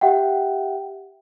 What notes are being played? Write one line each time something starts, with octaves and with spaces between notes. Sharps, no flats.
G4 E5 F#5 G5